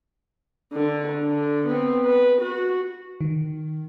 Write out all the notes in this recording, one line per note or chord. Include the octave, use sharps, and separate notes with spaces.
D3
D3
B3 C4
B4
F#4
D#3